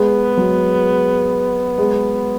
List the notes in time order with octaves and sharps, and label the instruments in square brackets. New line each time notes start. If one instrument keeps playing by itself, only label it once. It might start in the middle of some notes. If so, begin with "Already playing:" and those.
Already playing: [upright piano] G#3 [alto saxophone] B3
[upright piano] F#3
G#3